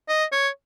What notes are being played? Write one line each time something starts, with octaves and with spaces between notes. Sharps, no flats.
D#5
C#5